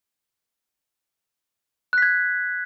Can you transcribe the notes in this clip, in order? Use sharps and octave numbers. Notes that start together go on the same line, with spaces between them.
F#6 G#6 B6